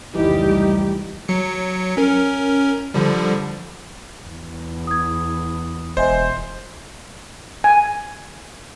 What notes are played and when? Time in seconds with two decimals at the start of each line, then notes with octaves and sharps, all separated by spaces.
0.15 F1 C#2 E3 G3 D#4 G4
1.28 F#3 C#7
1.97 C#4 A#4
2.94 D3 F3 G3
4.24 E2
4.87 D#6 G#6
5.97 E1 C5 D#5 E5 G#5
7.64 G#5